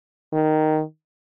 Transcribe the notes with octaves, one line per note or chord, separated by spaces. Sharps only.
D#3